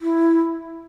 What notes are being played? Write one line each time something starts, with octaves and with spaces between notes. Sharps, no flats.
E4